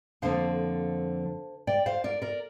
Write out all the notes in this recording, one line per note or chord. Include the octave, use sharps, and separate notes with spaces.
F2 D3 F3 A#3 C5 F5
D5 G5
C5 F5
A#4 D5
A#4 D5